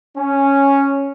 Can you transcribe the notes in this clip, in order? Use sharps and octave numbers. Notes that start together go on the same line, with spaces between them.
C#4